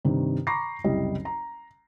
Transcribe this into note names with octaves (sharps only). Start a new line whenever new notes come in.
G2 C3 D#3
A#5 B5 C#6 D6 A#6 C7
F#1 C2 G3 D#5
A#5